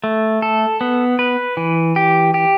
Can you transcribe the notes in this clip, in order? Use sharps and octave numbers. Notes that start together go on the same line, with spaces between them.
A3
A4
B3
B4
E3
G4
G4